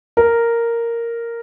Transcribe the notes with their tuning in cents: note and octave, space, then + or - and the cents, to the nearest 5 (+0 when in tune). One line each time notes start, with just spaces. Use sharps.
A#4 -5